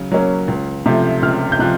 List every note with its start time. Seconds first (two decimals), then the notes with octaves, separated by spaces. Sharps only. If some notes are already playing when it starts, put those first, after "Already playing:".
Already playing: C#3 F#3
0.12 F#3 A#3 C#4
0.48 C#2
0.86 C3 F3 A3
1.23 C#2 F6
1.52 G6
1.59 C3 F3 F#6